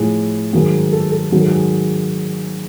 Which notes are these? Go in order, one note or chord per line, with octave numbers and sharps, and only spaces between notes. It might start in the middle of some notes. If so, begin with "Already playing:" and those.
Already playing: A2 F3 G#4
G#2 D#3 F#3 G#4
A4
A4
G#2 D#3 F#3 G#4
A4
G#4